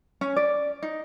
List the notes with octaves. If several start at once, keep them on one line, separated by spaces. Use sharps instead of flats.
C#4
D5
D#4